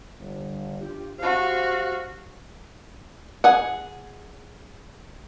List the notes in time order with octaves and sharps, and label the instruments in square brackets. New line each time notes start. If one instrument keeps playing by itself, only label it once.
[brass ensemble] G1
D4 F4 G4
[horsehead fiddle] F#4 F5 [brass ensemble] G4 C5
[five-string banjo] G#4 F#5